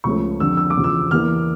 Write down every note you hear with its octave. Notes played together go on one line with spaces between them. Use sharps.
C#2 C#3 F3 A3 C#4 C#6
F2 D3 G3 E6
E6
D6
E2 C#3 F3
E6
E2 E3 A#3 F6